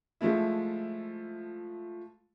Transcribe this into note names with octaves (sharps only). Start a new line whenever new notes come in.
F3 G#3 A3 E4